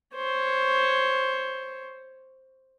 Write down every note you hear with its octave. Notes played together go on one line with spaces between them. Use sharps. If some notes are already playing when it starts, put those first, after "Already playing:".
C5 C#5